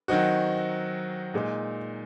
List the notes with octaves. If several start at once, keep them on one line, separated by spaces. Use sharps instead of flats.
D#3 F#3 C4 D#4 F#4
A#2 G#3 D#4